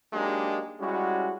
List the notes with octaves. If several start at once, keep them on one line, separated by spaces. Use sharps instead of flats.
F#3 G#3 A#3 D4 D#4 G4
G3 G#3 C#4 E4 F#4